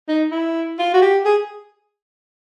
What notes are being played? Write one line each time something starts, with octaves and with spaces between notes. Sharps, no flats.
D#4
E4
F4
F#4
G4
G#4